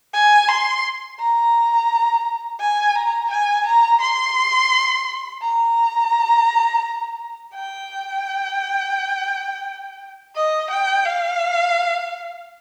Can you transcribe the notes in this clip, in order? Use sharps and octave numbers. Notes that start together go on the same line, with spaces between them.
G#5
C6
A#5
G#5
A#5
G#5
A#5
C6
A#5
G5
D#5
G5
F5